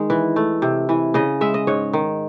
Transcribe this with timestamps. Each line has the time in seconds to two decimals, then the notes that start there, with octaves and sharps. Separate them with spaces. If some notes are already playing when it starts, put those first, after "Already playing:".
Already playing: D#3 G#3
0.10 E3
0.36 A3
0.62 C3
0.89 E3
1.14 C#3 D#5
1.41 G#3 E5
1.54 D#5
1.67 G#2 C#5
1.93 D#3